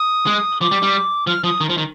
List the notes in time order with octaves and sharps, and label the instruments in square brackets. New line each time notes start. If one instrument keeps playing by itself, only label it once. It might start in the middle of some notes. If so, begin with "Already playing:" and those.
Already playing: [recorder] D#6
[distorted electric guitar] G#3
[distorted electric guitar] F3 [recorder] D6
[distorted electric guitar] G3
G3
[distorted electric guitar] F3 [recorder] F6
[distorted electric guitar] F3 [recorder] D#6
[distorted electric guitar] D#3
F3
D#3